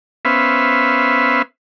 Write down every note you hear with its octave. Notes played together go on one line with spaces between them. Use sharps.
B3 C#4 B4 C5 E5 F5